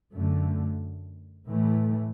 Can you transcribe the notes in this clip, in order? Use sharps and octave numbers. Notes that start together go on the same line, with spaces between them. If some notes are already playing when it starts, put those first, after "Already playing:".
F#2 D3 A3
A2 E3 A3